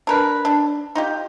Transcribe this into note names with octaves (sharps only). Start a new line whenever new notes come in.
D4 A#4 B4
D4
D#4 F4 G4